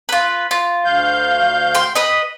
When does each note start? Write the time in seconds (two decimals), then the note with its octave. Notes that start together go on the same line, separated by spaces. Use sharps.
0.09 F4 B4
0.51 F4
0.85 D2 F5 G6
1.75 G5 C6
1.95 B4 D#5